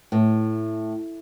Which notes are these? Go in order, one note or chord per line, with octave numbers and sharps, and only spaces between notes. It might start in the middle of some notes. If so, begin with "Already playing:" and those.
A2